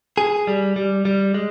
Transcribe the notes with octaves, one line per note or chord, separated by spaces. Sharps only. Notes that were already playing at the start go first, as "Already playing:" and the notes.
G#4
G3
G3
G3
G#3